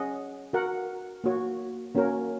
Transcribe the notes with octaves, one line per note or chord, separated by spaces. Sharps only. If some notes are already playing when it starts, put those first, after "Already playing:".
Already playing: C#4 G#4 D#5 F#5
F#4 A#4 F#5
A#3 F#4 C#5
A#3 C#4 F#4 A#4 C#5